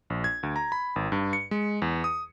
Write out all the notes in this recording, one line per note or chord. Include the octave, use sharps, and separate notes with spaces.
A#1
G#6
D2
A#5
B5
G#1
G2
C#7
G#3
E2
D#6